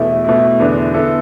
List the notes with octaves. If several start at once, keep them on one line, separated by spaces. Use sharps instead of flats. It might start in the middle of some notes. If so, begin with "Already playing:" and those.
Already playing: E2 B2 A3 E4
B2 A3 E4
E2 D3 B3 D4
D3 B3 E4 A4